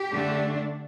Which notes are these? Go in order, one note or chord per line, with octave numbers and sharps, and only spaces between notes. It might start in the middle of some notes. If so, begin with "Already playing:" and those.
Already playing: G4
D3 A3 D4